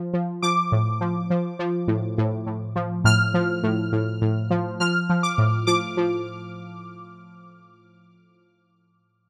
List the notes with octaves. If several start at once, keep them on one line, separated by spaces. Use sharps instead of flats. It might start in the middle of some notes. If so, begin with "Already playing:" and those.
Already playing: F3
F3
F3 D6
A2
F3
F3
F3
A2
A2
A2
F3
A2 F6
F3
A2
A2
A2
F3
F3 F6
F3
D6
A2
F3 D6
F3